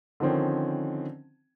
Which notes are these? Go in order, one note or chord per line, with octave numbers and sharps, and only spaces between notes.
D3 D#3 F3 C4 C#4